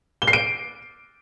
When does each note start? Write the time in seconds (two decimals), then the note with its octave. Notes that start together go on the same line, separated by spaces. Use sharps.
0.22 G7
0.27 C7
0.33 D7